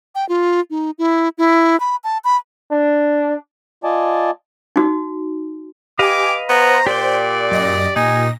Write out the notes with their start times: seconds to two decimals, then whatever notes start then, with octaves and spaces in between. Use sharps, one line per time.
0.15 G5
0.29 F4
0.70 D#4
0.99 E4
1.38 E4
1.80 B5
2.04 A5
2.24 B5
2.71 D4
3.84 F4 D5 D#5 G#5 A5
4.76 D#4 F#4
5.99 G4 B4 D#5 F5 G#5 D6
6.49 B3 C5 A#5
6.87 A#2 G4 D5 G5
7.51 F#2 D#5 A#6
7.96 A#2 D#4 G#5 A#6